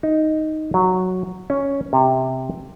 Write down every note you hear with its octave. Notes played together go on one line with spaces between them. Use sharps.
D#4
F#3
C#4
C3